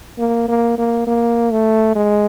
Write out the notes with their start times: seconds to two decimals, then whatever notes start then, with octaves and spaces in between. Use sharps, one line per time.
0.19 A#3
0.48 A#3
0.78 A#3
1.07 A#3
1.51 A3
1.95 G#3